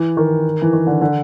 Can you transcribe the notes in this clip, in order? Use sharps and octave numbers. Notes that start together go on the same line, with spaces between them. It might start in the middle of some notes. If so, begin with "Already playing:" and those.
Already playing: E3
D#3
E3
D#3
D3
D3